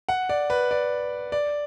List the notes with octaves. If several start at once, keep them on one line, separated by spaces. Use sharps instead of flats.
F#5
D5
B4
D5
D5